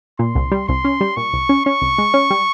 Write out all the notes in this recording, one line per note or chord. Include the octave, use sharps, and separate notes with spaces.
A#2 C6
C2
G3
C2 C6
C#4
G3
A#2 C#6
C2
C#4
C#4 C#6
C2
G#3
C#4
G3